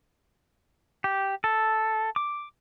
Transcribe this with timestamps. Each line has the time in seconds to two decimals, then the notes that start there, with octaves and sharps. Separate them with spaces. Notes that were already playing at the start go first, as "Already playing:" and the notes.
1.04 G4
1.44 A4
2.16 D6